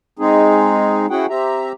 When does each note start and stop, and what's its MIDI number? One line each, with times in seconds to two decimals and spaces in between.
0.19 1.06 56
0.19 1.06 60
0.19 1.06 63
0.19 1.06 68
1.10 1.26 61
1.10 1.26 64
1.10 1.26 66
1.10 1.26 68
1.10 1.26 78
1.10 1.26 79
1.29 1.72 60
1.29 1.72 67
1.29 1.72 76
1.29 1.72 82